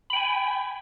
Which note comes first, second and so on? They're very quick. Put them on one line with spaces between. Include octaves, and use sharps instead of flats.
B5 G5 G#5